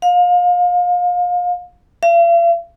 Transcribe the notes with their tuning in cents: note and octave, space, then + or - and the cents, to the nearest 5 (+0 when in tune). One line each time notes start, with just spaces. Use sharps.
F5 +30
F5 -45